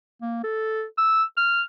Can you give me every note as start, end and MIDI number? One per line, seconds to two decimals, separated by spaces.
0.22 0.41 58
0.44 0.84 69
0.98 1.23 88
1.37 1.62 89